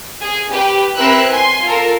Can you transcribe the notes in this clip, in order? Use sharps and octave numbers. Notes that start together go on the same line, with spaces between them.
G#4
G4 B4
C4 E4 A#4 B4 E6 F#6
G#5 C6
F4 A4 A#4